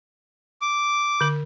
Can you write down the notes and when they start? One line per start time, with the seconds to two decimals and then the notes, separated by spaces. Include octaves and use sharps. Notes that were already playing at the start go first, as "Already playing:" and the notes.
0.62 D6
1.21 D3 A#4